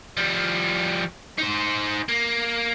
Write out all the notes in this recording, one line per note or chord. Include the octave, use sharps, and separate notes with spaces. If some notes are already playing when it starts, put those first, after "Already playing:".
F3 G3
D#4 C5
A#3